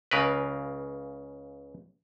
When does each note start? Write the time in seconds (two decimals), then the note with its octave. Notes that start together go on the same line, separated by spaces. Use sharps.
0.11 C#2 C#3 A#4 B4